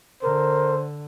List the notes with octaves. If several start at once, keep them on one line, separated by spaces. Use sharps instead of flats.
D3 A#4 C5